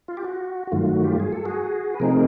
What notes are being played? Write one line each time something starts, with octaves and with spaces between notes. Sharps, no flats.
F4
G4
F#4
F#4
G2 D#3 F#3 A3 F4
F#4
F4 G4
G#4
A4
F#4 G#4
B4
C3 F3 A3 C4 D#4 G#4 A#4